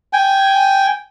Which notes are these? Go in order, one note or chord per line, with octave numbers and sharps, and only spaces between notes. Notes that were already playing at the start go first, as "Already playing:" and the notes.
G5 G#5